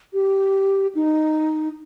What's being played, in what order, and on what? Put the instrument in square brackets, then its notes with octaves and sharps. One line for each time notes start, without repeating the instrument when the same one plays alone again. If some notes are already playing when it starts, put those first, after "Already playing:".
[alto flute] G4
D#4